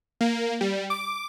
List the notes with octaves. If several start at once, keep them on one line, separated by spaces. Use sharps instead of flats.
A#3
G3
D6